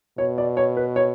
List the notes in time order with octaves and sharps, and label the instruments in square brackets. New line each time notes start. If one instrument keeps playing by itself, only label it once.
[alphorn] B2 [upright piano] C#5
[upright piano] D5
C#5
B4
C#5